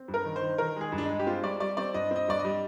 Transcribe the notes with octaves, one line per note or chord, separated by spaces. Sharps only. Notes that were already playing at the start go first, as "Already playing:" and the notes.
Already playing: C4
G2
A#4
D#3
C5
D#3
D#3 A#4
G#3 G#4
G2
D4
D#4
G#3
G4
C4 F4
G3 D5
G3 D5
C4 D5
G2 D#5
C4 D#5
G2 D5
D#5
G3